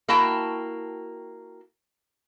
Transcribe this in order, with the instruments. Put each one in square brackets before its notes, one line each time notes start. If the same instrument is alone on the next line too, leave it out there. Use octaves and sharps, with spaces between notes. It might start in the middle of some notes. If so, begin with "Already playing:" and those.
[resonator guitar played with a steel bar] A#3 E4 F#4 G5 A5